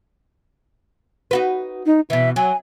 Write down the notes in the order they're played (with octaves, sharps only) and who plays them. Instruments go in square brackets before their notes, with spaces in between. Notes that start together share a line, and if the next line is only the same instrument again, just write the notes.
[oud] D#4 F#4 B4
[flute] D#4
[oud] B2 E3 [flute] E5
[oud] F#3 [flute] G#5